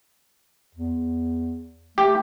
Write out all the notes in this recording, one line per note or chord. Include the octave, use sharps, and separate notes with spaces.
E2
A3 G4